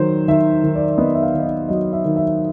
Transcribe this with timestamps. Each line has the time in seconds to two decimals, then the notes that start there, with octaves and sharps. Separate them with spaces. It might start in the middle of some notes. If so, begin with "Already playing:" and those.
Already playing: D#3 F#3 C5
0.28 D#3 E5
0.64 D#3
0.75 D5
0.98 B3 D#5
1.15 E5
1.23 F5
1.34 D#3
1.40 D#5
1.46 E5
1.69 F#3 D#5
1.93 E5
2.05 D#3
2.16 E5